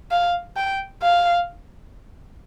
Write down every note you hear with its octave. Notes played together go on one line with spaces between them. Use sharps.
F5
G5
F5